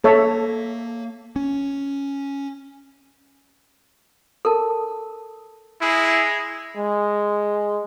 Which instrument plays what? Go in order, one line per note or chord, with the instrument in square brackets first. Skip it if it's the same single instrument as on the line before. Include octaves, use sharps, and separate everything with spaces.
[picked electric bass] A#3 [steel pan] A4 C#5 E5
[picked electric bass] C#4
[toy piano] A4 A#4 A5
[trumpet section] G#3 G#4 [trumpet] E4
[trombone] G#3